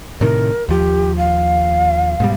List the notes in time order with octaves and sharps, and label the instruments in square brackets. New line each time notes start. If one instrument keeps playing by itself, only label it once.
[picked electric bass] A2 C3 D#3 [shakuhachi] A#4
[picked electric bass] D#2 F3 [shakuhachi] G4
[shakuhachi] F5
[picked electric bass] G#2 B2 G3